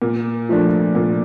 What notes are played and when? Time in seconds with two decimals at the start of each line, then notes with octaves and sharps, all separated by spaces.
0.02 A#2
0.49 F3 A3 D4
0.95 A#2